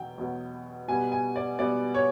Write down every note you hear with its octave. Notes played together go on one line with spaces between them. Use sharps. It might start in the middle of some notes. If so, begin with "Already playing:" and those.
Already playing: E2 B2 F#3 G5
E2 B2 F#3
B2 G3 B3 G#5
G#5
D5
B2 G3 B3 D5
C#5